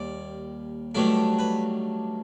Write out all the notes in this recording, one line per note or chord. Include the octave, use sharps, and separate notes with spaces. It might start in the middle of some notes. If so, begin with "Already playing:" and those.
Already playing: D#2 D#3 G3 D5
G2 D#3 F#3 A3 D4 D5
B4